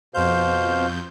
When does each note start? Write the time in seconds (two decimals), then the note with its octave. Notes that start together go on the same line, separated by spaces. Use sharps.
0.14 F2 B2 C5 F5 G6